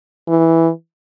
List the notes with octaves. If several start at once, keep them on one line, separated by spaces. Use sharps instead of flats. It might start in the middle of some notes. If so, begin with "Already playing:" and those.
E3